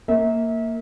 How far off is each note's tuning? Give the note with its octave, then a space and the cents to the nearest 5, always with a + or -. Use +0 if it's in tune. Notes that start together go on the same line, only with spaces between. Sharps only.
A#3 -10 E5 -30